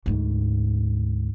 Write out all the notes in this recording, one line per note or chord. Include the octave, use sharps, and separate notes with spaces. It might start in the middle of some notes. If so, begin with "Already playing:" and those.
D2 G#2